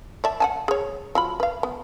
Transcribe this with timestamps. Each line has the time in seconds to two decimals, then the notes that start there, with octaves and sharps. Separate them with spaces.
0.24 D5 E5 A5
0.40 F#5 G#5 A5
0.68 G#4 C#5
1.15 F#3 F4 B5
1.40 B4 F5
1.63 B3